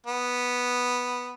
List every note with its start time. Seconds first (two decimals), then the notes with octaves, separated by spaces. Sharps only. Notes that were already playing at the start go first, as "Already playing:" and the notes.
0.07 B3